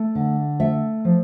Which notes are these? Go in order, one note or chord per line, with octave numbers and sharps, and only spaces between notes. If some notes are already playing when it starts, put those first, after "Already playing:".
Already playing: A3
D3
A3 E5
F3